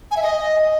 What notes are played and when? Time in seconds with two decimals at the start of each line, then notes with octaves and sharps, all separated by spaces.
0.11 G#5
0.17 E5
0.22 D#5